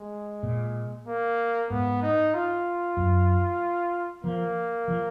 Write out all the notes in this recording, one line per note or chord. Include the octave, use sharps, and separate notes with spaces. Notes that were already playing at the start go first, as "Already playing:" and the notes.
Already playing: G#3
A#2
A#3
G#2 B3
D#4
F4
F#2
F3 A#3
F3